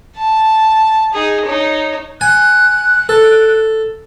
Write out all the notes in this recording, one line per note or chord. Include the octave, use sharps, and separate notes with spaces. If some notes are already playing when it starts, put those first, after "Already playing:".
A5
D#4 G#4
D#4 C#5
G#5 F#6
A4